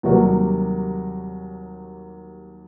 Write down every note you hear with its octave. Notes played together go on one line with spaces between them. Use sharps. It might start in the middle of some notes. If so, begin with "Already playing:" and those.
D#2 C3 F#3 G3 F#4 A#4